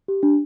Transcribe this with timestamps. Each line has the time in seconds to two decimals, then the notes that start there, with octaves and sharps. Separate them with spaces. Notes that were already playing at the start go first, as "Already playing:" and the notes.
0.08 G4
0.23 D4